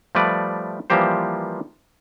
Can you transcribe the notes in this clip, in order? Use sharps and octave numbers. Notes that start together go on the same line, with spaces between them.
F3 G3 A3 B4 D5
E3 F3 G3 A#3 G4 C5